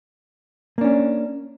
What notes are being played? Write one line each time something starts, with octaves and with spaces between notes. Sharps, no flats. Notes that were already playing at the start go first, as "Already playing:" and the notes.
A#3 C#4 D4